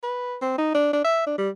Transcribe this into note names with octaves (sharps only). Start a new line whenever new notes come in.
B4
C4
D#4
D4
D4
E5
D4
G3